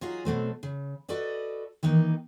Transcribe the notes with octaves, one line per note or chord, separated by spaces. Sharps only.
F#3 D#4 F4 F#4 G#4
B2 F#3 A3 C4
C#3
F#4 A4 B4 D5 D#5
D#3 E3 A#3 D#4